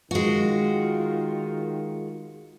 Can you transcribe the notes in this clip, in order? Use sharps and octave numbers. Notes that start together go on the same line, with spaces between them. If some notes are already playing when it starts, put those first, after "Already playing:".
D#3 G#3 F4 F#4